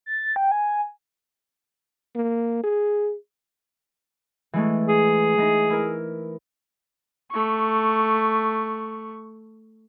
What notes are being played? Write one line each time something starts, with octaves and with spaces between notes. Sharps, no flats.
A6
G5
G#5
A#3
G#4
E3 G#3 A3
G#4
E3 D#4
E4 A#4
A3 C#6